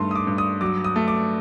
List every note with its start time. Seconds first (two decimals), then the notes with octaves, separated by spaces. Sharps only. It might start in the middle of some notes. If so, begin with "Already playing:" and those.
Already playing: G2 D#3 A3 C6
0.11 D#6
0.15 D6
0.27 G2
0.38 D#6
0.61 F#3 D6
0.84 D#6
0.96 A3
1.08 D6